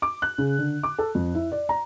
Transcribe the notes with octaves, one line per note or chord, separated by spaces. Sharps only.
D6
F#6
C#3
D3
D6
A4
F2
E4
D5
A#5